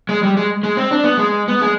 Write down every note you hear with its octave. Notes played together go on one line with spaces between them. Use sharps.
G#3
G3
G#3
G#3
C4
D4
B3
G#3
B3
G#3